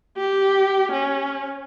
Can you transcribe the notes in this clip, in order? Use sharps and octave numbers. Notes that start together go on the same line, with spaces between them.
G4
C#4